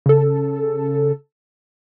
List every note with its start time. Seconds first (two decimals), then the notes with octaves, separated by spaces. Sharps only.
0.06 C#3 A4